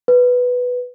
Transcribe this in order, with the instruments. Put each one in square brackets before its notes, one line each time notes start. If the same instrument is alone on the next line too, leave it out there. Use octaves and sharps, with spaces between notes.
[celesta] B4